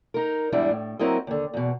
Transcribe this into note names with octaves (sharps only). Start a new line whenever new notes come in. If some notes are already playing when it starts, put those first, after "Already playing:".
D#4 A#4
E2 G#2 G3 D4 E4
A2
F#3 C4 E4 A#4 D#5
D#2 D3
E2 B2